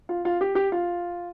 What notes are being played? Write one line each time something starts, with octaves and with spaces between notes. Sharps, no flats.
F4
F4
G4
G4
F4